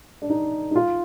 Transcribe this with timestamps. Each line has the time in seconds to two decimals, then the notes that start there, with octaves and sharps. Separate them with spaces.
0.22 D4
0.30 D#4
0.71 D#4
0.76 F4